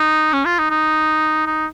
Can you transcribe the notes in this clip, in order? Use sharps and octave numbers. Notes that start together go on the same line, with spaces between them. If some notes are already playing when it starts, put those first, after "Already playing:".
Already playing: D#4
C#4
F4
D#4
D#4
D#4